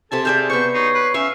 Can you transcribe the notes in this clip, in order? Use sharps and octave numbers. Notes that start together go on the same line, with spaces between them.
C3 A4 E5 G#5 A5
G#4 D5 E5 F5 G6
B3 C5 C#6 G6
D#4 C#5 C7
B4
C#4 E5 F5 C#6